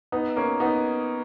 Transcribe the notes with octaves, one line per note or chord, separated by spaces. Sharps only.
B3 D#4
A#3 C#4
B3 D#4